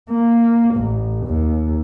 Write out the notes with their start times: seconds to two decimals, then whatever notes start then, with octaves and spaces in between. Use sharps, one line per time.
0.10 A#3
0.75 A1
1.26 D#2